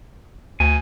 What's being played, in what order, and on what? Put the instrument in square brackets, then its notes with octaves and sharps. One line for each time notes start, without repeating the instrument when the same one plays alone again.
[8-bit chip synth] D2 [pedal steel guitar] G#5